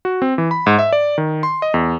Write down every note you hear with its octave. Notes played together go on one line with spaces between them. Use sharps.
F#4
C4
E3
B5
G#2
E5
D5
D#3
C6
D#5
E2